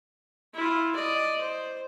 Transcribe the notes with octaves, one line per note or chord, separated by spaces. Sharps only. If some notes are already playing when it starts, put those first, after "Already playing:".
E4 F4
D5 D#5
C5